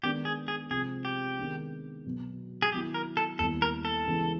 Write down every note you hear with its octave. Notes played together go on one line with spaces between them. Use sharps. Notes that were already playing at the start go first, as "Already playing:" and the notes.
D#3 G#3 B3 D4 G4
G#4
G#4
C3 F3 G#3 C4 G#4
G4
D#3 G#3 B3 D4
B2 F#3 B3
G#4
D#3 F#3 B3 E4 G4
A#4
A4
D#2 D#3 G3 B3 E4 A4
A#4
A4
C#3 E3 G#3 B3 E4